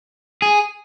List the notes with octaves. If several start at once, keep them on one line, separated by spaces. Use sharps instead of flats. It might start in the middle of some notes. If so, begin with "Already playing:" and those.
G#4